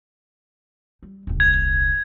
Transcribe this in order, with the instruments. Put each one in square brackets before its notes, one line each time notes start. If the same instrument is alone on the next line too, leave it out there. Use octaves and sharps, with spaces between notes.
[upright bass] G3
D#1 C2
[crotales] G#6
G#6